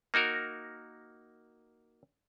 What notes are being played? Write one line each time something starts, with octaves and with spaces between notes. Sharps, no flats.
A#3 D#4 F#4 A#4